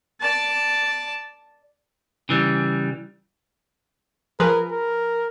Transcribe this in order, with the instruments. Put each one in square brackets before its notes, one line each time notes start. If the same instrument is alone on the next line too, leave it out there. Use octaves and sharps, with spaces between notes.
[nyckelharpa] D5 A5
[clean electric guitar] C#3 E3 G3
[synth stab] F3 G#4 B4 [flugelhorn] A#4
[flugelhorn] A#4